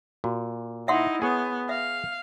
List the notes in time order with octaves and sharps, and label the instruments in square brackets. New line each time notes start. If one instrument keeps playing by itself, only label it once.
[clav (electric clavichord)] A#2 [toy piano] F#4
[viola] D#4 E4 [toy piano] E5 F#5 C6
[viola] B3 [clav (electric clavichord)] G#4 C#5
[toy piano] E5 [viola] F5